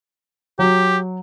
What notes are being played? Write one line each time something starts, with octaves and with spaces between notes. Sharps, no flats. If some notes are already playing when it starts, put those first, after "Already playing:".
F#3 G4